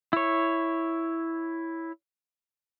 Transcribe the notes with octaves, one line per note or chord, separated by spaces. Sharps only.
E4 C#5